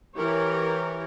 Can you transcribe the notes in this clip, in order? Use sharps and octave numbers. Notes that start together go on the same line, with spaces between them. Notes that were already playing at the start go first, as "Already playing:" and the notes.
E3 G4 A#4 C#5